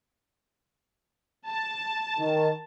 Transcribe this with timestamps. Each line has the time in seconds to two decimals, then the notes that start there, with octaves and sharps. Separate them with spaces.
1.48 A5
2.18 D#3